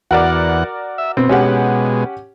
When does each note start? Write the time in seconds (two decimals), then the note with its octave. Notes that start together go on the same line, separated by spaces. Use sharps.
0.11 E2 F#4 A#4 D5 F#5
0.98 E5
1.17 B2 C4
1.29 B2 G#3 C#4 G4 F#5